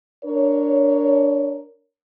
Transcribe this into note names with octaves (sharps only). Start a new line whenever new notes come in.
D4 A#4 C#5